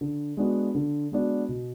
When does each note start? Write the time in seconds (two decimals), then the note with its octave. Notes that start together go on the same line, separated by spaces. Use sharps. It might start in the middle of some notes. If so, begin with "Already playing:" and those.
0.01 D3
0.37 G#3 B3 D4 F#4
0.75 D3
1.12 G#3 B3 D4 F#4
1.49 B2